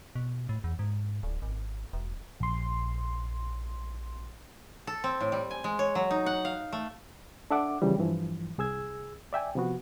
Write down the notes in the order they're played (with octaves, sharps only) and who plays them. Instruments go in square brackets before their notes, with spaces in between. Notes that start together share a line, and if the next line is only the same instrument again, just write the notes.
[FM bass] B2
A2
E2
G#2
D1
G#1
E1
[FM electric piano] A#1 C6
[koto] A4
C4
A2
G3
G#5
G#3
C#5
F#3
D#4
F#5
F5
A3
[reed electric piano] D4 A4 E5 F#5 D6
C#3 E3 F3 G3
G2 E3 F3
C2 G#4 E6 G#6
D5 E5 G5 G#5
C3 F3 B3 F#4